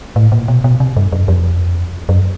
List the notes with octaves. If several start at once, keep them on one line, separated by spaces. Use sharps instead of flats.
A2
A#2
B2
B2
C3
G2
F#2
F2
F#2